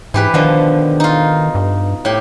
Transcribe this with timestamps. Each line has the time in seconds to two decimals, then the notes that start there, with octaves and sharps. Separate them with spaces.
0.14 G#2 E3 G4 B4
0.34 B2 D3 D#3 F3
1.00 D#4 F4
1.55 G2
2.05 A2 G4